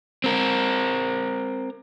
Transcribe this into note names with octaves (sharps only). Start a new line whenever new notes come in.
C4 A#4